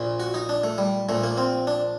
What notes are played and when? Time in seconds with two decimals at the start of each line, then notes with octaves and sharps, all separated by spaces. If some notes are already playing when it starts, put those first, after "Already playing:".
Already playing: A#1 A#2
0.20 F#4
0.34 D#4
0.49 D4
0.64 A3
0.78 G3
1.09 A#1 A#2 A3
1.24 A#3
1.37 C4
1.67 D4